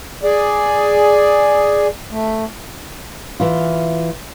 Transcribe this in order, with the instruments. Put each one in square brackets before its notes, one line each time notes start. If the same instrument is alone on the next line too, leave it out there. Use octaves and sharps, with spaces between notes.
[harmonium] G#4 D5
A3
[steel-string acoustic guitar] E3 F4